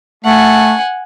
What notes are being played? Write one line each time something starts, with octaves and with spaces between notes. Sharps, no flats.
A3 F#5 G#5